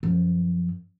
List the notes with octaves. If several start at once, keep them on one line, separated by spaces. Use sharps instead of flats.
F#2 F3